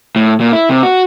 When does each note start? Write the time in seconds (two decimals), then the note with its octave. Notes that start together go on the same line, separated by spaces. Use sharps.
0.16 A2
0.40 A#2
0.53 E4
0.70 C3
0.83 F#4